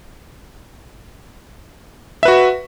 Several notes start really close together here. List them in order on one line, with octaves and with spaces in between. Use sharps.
E5 B4 F#4